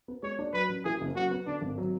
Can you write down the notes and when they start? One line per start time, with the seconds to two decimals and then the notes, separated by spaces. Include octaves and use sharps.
0.08 B3
0.23 G#3 C#5
0.39 D4
0.53 F#3 B4
0.69 A1
0.85 E3 G#4
1.01 F#1
1.16 F#3 F#4
1.31 B3
1.46 D3 D4
1.61 G#1
1.78 F#3